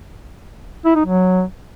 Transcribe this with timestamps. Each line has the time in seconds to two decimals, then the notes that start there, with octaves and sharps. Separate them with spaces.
0.85 E4
0.95 D#4
1.05 F#3